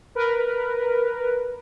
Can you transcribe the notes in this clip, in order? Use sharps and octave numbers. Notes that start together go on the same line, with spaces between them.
A#4 B4